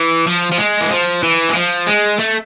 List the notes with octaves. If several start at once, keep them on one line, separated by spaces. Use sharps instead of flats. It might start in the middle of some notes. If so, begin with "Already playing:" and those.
Already playing: E3
F3
F3
G#3
E3
F3
E3
G#3
F3
G#3
A3